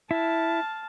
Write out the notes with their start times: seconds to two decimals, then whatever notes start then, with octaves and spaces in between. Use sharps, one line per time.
0.11 E4 F5 A5